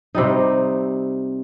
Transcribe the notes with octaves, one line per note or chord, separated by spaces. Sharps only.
C3 G3 D#4